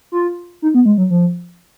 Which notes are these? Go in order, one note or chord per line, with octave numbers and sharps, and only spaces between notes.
F4
D#4
B3
G#3
F#3
F3